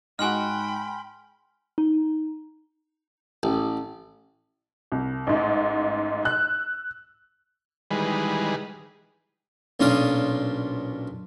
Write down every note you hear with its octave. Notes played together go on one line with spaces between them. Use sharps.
G#2 D#4 F#4 G5 G#5 B5 C6 F6
D#4
A1
C2
A1 G#2
E6 F#6
D#3 E3 G3 G#3 G#4 B4
B1 A#2 C#4 D4 F4 D#6